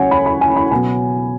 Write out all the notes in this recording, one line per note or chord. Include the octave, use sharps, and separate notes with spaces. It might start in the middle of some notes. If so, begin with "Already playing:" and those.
Already playing: C#2 C#3 F#3 C#4 C#5 F#5 G#5
B5
B5
G#5
B5
B2 F#3 B3 G#5